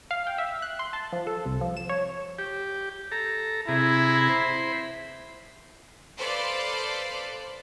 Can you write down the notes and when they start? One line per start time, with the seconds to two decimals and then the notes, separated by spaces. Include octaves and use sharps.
0.11 F5
0.27 G5
0.38 E5
0.62 F#6
0.79 C6
0.93 A5
1.13 F3
1.27 A4
1.46 C2
1.61 F3
1.77 E7
1.89 C#5
2.39 G4
3.12 A4 A#5
3.68 C3 E4 G#4 A#5
4.29 C5 B5
6.16 A4 B4 C5 D5 F5 C6